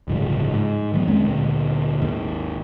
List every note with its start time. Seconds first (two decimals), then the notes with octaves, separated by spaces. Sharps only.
0.08 D1 G2 C#3 F3
0.54 G#2
0.94 D#3 F#3 B3
1.07 E2 G#3 C4 C#4
1.24 D2 A#2
2.00 G#1 D#2